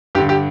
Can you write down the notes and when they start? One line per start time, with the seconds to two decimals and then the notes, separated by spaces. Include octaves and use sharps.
0.15 G2 G4
0.18 D3
0.29 G4